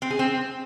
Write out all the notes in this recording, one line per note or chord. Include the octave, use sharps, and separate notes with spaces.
C4
G#4
C4